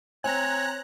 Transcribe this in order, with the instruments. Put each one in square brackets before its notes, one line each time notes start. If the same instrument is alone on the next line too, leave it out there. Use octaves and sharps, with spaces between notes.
[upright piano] C4 [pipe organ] C#5 [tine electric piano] G#5 [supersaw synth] A#5 F#6